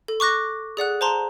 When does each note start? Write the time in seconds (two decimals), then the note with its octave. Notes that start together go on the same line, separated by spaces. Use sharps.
0.08 A4
0.20 C#6 D6 F#6 A#6
0.77 G#4 D5 F#5 F#6
1.01 C5 A5 A#5 C6